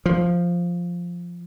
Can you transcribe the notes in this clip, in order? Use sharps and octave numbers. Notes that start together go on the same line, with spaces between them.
F3